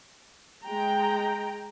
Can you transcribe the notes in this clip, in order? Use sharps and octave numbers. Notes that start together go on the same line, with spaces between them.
G#3 G5 A#5